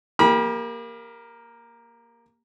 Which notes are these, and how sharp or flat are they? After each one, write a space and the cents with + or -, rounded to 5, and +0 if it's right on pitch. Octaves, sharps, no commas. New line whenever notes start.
A#3 +0 G4 +35 B5 -35